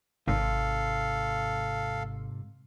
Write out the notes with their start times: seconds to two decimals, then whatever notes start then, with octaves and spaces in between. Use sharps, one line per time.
0.28 G#1 G#2 C3 A4 F5